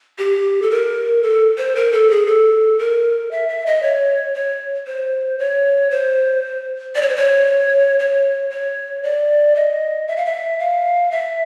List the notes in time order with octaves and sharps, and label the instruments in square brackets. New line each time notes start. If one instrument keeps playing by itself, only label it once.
[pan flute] G4
A4
A#4
A4
C5
A#4
A4
G#4
A4
A#4
E5
E5
D#5
C#5
C#5
C5
C#5
C5
D5
C#5
C5
C#5
C#5
C#5
D5
D#5
E5
F5
E5
F5
E5